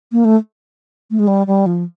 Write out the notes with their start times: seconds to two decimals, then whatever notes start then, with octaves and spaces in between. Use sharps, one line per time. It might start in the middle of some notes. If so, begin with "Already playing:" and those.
0.12 A#3
0.25 A3
1.11 A3
1.19 G#3
1.27 G3
1.47 G3
1.66 F3